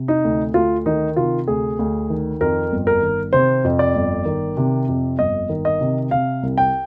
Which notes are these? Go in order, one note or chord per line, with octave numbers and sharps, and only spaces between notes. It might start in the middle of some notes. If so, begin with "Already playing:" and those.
Already playing: C3
D#4
D2
D2 F4
D#3 D#4
C3 F4
D2 G#4
D2
D#3
F2 A#4
G1
A#4
D#3
C3 C5
F2
D5
G1
D#3
C3
F2
G1 D#5
D#3
D#5
C3
C3 F5
C2
G5